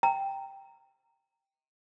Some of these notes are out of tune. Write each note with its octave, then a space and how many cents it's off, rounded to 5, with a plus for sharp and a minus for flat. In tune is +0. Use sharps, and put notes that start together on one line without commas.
G5 +0 A#5 -15